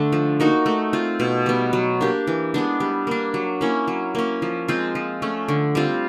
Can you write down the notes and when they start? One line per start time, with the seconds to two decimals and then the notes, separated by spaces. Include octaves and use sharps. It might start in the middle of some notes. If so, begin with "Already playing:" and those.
Already playing: D3 A3 D4
0.12 F3
0.40 A#3 D#4 F#4
0.66 A3
0.93 C4 F4
1.20 B2
1.46 G3 B3
1.73 F#3
2.01 A#3 D4 G4
2.27 E3
2.54 G#3 B3 D4
2.80 G3
3.07 A#3 D4
3.34 F#3
3.61 A#3 C#4 E4
3.88 F#3
4.15 A#3 C#4
4.42 F3
4.68 G#3 C4 F4
4.95 F3
5.22 A3 C#4
5.48 D3
5.75 G3 C4 F4